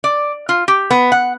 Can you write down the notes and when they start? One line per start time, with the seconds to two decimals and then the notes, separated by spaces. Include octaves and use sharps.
0.04 D5
0.49 F4
0.68 G4
0.91 B3
1.12 F#5